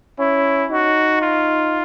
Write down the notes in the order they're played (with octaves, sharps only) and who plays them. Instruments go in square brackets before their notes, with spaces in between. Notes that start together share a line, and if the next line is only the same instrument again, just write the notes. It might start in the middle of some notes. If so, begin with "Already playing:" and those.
[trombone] C#4 [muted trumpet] E4
[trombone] D#4 [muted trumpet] F#4
[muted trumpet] F4